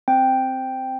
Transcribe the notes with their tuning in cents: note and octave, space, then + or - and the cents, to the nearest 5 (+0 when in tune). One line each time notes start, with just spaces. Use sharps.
C4 +0 G5 +0